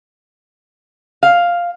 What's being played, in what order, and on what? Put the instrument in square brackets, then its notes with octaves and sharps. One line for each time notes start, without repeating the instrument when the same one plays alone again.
[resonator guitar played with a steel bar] F5